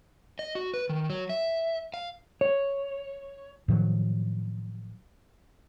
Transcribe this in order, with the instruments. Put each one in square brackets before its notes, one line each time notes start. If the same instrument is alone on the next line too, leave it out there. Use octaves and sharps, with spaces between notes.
[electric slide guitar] D#5
F#4
B4
D#3
F#3
E5
F5
C#5
[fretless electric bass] A2 D#3 F3 F#3